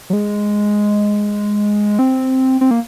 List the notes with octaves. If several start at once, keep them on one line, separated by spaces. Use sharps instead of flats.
F#3
G#3
C4
C4
A#3